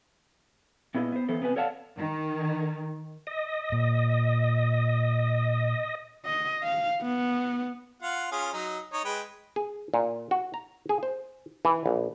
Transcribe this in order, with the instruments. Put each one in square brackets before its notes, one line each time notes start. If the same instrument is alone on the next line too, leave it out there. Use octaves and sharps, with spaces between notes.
[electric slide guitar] A#2 B3 E4 G#4 D#5
B3 C5
D#3 E3 B3 A4 C5
C3 B3 A#4 B4 G#5
A4 C#5 D5 F5 F#5 A5
[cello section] D#3
[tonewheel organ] D#5
[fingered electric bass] A#2
[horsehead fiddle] D#5
F5
B3
[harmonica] F4 F5 F#5
C#4 F4 G#4
F#3 D#4
D#4 C#5
G#3 B4 G5
[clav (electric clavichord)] G#4
A#2
F#4
A#5
G#4
C5
E3
A#1